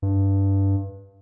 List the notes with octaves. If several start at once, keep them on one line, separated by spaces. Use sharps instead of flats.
G2